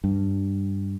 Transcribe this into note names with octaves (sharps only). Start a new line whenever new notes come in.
G2